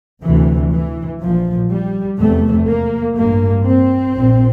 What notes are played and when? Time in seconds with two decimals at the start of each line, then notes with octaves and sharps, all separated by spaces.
0.23 D2 C3 E3
0.72 E3
1.20 A#1 A#2 F3
1.71 G3
2.19 F1 E2 C3 A3
2.67 A#3
3.16 A1 G2 A#3
3.66 C4
4.14 A#1 A#2